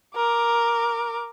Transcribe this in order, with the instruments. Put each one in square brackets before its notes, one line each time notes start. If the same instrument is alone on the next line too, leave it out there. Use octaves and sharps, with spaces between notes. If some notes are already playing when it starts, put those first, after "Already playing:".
[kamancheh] A#4 D6